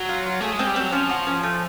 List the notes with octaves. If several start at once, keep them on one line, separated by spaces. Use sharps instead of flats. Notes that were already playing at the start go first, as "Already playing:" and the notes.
Already playing: F#3
F4
F4
A3 G#4
G#3
C4
G3
F#3 C4
F3 C#4
F#4
C#4
A3